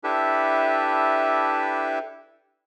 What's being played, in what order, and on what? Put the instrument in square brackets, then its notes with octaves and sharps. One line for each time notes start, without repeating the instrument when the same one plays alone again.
[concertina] D4 E4 G4 A4 B4 E5